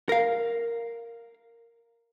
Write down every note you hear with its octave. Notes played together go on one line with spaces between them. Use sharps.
A#4 F5